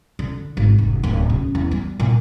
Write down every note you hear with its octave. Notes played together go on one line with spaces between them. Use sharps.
D3
G#1
F1
D1
C#3
E2
G3
A#2